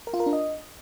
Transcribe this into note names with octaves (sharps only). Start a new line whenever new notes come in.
A#4
F4
A#4
D4
D#5